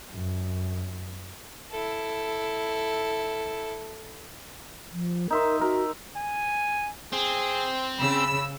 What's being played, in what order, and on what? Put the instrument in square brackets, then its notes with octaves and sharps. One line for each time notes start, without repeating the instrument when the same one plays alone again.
[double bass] F#2
[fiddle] E4 A4
[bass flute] F3
[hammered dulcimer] D#4 E5 C6 [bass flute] A#4
[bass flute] F#4 [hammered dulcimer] A#4
[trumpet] G#5
[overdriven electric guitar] C4 [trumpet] G#4
[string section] C#3 E6 [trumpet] B5